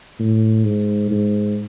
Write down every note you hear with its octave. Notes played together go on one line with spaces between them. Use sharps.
A2
G#2
G#2